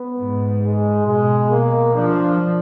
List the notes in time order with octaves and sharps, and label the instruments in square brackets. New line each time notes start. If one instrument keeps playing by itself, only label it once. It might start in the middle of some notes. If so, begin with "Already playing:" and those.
Already playing: [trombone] B3
[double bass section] G#2
[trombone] G#3
[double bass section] B2 [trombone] G#3
[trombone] A#3
[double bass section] F3 [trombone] D4